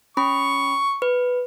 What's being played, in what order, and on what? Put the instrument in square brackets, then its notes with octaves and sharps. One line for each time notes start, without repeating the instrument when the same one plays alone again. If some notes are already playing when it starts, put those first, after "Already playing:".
[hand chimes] C#4 B5 [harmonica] C#6
[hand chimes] B4